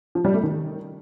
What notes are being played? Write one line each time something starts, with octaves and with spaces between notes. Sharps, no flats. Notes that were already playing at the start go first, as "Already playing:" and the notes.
F3
G3
A3
D#3